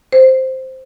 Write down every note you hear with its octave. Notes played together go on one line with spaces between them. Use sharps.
C5